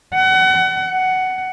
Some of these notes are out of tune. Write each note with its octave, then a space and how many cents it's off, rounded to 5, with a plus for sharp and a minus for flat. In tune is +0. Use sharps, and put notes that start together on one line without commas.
F#5 +30
F#5 +15